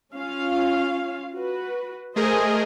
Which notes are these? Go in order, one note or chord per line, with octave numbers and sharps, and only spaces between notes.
C#4 F4 F5
F#4 B4
A3 G#4 A#4 C5 D#5 G#5